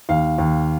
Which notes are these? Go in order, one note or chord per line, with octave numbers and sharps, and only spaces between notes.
D#2 F5
D#2